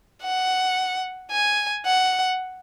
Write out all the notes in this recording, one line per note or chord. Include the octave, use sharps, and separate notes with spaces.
F#5
G#5
F#5